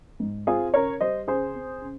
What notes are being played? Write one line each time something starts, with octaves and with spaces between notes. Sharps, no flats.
G#2
C4 F4 G#4
C#3 A#4 C#5
G3 C5 D#5
C#3 G#4 C5
C4
C#3